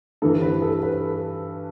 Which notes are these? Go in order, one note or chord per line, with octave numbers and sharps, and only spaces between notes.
G2 E3 A4
B4
A4
B4